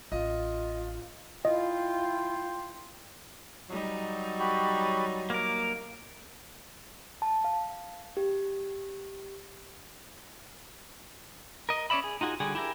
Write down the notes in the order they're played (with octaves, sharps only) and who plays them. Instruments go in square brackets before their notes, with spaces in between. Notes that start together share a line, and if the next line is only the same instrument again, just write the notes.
[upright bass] A1 [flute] F4 [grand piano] D#5
[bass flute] E4 [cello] F4 [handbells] D#5 [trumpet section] G5 C6
[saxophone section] F#3 [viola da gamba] G3 D#4
[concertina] F#4 G4 B5
[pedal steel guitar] A#3 A#4 [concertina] D6
[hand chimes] A5
F5
G4
[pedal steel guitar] A#4 D#5
C#4 C#5 D5 E5 B5
G#4
D#4 F4 F#4 G#4
D3 G3 F#4 G#4
E4 G4 G#4 A#4 E5